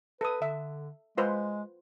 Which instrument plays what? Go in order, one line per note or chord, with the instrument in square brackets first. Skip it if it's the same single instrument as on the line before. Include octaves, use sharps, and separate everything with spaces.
[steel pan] A4 D#6 [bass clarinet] B4
[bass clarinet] D3 [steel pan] E5
[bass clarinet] G#3 [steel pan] F4 B4 C5